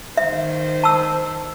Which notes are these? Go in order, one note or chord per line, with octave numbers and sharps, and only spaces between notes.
D#3 C5 E5
A5 E6